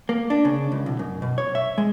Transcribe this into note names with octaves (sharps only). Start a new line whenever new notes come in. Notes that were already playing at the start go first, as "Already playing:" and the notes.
A#3
D4
C#3
C#2
B1
F#2
B2
C#5
E5
G#3